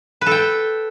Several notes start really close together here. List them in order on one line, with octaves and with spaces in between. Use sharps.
B4 A4 G5